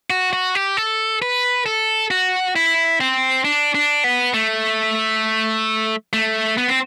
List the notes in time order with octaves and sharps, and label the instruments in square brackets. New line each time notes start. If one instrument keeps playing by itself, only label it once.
[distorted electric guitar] F#4
F#4
G4
A4
B4
A4
F#4
E4
C4
D4
D4
B3
A3
A3
B3
C4